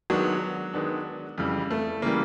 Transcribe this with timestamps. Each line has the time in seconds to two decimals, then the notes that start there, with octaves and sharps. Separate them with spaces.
0.10 D#3 F#3 G#3 B3 D4
0.73 D#3 G#3 B3 D4
1.38 F2 C#3 E3 G3
1.71 A3
2.02 C#3 E3 G3 A#3